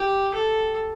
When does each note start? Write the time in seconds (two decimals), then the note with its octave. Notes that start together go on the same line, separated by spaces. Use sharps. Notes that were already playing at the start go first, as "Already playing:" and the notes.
Already playing: G4
0.35 A4